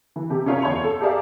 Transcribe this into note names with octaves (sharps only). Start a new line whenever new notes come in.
E3
C3 G4
C#4 E4 F4 A#4 C#5
E2 C#5 C6 F7
A4
G4 G#4 A#4 D5 E5 F5